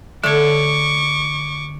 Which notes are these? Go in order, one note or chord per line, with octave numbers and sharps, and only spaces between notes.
D3 A3 C#5 C#6 D6